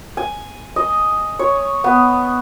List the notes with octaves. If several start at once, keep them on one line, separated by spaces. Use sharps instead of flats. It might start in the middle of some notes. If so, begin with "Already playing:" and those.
G#5
D#5
C#5
B3